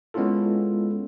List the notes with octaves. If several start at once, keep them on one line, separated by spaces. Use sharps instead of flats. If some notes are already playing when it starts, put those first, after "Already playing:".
G#3 B3 C#4 E4 F4 A4